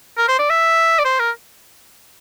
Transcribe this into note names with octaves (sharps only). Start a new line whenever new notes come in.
A#4
C5
D5
E5
D5
C5
A#4